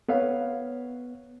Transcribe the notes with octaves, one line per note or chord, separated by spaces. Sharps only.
B3 B4 C#5 F5